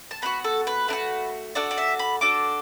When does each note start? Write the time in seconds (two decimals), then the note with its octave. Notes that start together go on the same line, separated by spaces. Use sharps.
0.11 A5
0.22 B3 D4 F#4 B5
0.44 A4
0.67 B4
0.88 A3 D4 F#4
1.55 D4 F#4 A4 D5
1.71 D5
1.78 E5
1.99 B5
2.21 D4 F#4 A4 D6